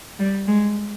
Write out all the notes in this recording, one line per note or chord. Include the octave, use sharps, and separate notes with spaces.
G3
G#3